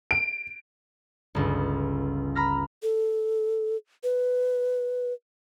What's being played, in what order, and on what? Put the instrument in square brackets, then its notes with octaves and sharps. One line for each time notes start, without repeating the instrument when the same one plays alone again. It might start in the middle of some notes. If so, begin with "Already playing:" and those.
[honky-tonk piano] D7
[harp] G1 C#2
A#5 B5 F6 A#6
[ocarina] A4
B4